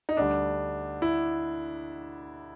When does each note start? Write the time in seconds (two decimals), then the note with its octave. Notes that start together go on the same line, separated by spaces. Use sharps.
0.09 D#4
0.17 D2 D3 G3 D4
1.02 E4